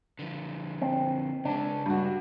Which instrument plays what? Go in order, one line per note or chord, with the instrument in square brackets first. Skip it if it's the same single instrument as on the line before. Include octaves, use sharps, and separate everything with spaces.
[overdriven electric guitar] D3 F3
[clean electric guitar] C4
[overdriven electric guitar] C#3 G#3 [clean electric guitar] D4
[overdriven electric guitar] C#2 [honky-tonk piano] G2 F#4